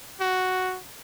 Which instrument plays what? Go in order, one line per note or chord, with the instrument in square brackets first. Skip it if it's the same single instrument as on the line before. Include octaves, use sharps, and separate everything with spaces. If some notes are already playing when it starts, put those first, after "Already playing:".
[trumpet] F#4